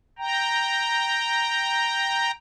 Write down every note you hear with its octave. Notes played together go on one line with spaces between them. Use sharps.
G5 A#5